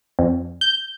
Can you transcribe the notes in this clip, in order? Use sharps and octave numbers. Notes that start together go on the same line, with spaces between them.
F2
G6